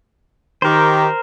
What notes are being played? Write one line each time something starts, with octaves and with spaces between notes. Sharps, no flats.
D#3 G4 A#4 C5